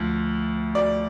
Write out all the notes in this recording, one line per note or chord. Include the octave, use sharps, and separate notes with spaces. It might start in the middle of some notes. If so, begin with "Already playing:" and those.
Already playing: D2 F3
D5